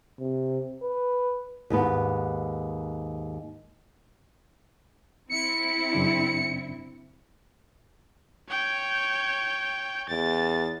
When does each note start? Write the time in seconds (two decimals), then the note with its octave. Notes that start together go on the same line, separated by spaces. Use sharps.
0.20 C3
0.83 B4
1.70 D#2 G#2 B3
5.30 C4 E4 C#7
5.93 F#2 C#3 D4
8.49 C#5 G5
10.09 E2 A6